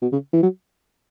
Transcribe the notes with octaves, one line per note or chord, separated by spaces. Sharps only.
B2
C#3
E3
F#3